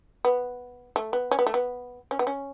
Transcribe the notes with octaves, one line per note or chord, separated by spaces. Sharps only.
B3
A3
B3
C#4
B3
A3
B3
C#4
B3
C#4